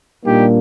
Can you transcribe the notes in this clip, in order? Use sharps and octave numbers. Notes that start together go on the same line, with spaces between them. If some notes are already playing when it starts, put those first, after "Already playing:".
A#2 G3 A#3 D4 D#4 G4